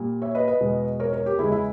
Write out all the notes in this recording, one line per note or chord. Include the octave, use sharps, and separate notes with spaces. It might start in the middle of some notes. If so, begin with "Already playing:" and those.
Already playing: A#2 G3
C#5 E5
B4 D#5
B4 D#5
E2 B2 G#3
A#4 C#5
A#4 C#5
G4 A#4
E2 C#3 G#3 E4 G#4
E4 G#4